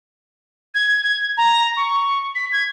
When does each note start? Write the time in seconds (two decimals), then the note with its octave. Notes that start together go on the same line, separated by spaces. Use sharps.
0.74 G#6
1.03 G#6
1.37 A#5
1.77 C#6
2.35 B6
2.52 G#6